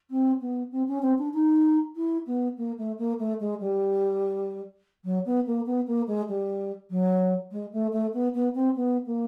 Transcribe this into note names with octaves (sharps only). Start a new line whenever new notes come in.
C4
B3
C4
C#4
C4
D4
D#4
E4
B3
A#3
A3
A#3
A3
G#3
G3
F#3
B3
A#3
B3
A#3
G#3
G3
F#3
G#3
A3
A3
B3
B3
C4
B3
A#3